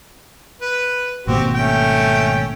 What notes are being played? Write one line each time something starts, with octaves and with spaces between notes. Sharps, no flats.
B4
G#1 B2 A#3 C4 F#4 G4
A3 C#4 G5